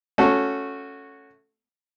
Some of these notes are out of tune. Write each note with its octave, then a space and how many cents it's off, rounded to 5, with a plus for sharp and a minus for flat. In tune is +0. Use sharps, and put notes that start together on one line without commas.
A3 +0 C#4 +0 F#4 -10